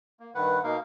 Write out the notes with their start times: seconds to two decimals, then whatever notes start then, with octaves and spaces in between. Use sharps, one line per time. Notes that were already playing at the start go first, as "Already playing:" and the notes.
0.20 A#3
0.35 G2 D#3 B4 F#5
0.64 B2 A#3 D#4 A#4 F5